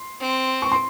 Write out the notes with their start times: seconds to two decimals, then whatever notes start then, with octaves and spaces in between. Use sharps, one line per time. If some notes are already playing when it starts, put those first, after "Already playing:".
Already playing: C6
0.21 C4
0.62 C#6
0.72 C6